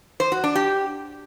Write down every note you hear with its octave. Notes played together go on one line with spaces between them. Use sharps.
C5
F#4
D4
G4